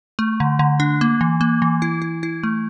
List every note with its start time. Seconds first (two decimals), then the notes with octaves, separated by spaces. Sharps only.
0.19 A3
0.40 D3
0.59 D3
0.80 D4
1.01 A#3
1.21 E3
1.41 A#3
1.62 E3
1.82 E4
2.02 E4
2.23 E4
2.43 A3